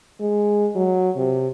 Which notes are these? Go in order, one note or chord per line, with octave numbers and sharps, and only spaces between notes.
G#3
F#3
C3